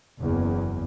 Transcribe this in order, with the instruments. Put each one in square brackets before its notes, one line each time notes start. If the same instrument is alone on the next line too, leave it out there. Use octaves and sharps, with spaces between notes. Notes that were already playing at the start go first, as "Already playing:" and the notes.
[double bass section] F#1 E2